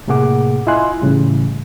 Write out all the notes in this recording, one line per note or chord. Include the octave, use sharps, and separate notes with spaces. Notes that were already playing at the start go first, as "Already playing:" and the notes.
A2 C3 A#3 G#4 F#5 D6
E4 F4 D#5 G#5 C6 F#6
A2 C#3 E3 G3